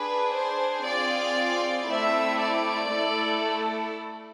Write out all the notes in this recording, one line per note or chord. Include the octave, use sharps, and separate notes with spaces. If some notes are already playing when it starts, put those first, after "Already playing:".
Already playing: D4 G#4 B4
C5
C4 F4 G#4 D5
A3 C4 E4 E5
D5
A3 E4 A4